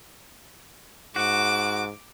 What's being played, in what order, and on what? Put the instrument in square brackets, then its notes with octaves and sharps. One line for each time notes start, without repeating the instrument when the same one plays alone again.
[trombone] G#2 [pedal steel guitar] F#4 [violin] D6